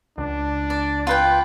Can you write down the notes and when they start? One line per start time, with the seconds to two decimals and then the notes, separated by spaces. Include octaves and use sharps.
0.18 C#2 D4
0.70 D5
1.07 F4 B4 G5